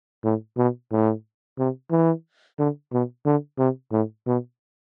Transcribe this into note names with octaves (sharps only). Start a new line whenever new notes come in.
A2
B2
A2
C3
E3
D3
B2
D3
C3
A2
B2